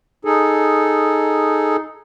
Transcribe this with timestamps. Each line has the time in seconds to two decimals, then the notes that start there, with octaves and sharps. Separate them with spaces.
0.25 D#4 G#4 A4